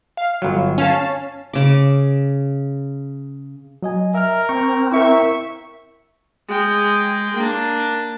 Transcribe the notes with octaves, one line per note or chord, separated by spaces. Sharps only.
F5
G1 F#3
C#4 F5 A5
C#3 D6
F#3 D#5 G#5
A#4 E5 F6
C4 C#6
E4 A#4 E5 C#6
G#3 G5
A#3 D4